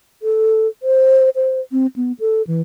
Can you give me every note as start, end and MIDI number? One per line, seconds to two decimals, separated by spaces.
0.22 0.68 69
0.83 1.30 72
1.36 1.61 72
1.72 1.87 60
1.96 2.12 59
2.20 2.42 69
2.47 2.61 52